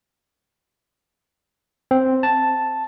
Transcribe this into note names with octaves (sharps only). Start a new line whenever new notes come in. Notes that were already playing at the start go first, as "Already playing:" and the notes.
C4
A5